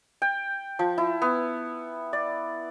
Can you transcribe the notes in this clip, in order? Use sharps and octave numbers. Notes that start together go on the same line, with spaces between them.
G5
F3
E4
B3
D5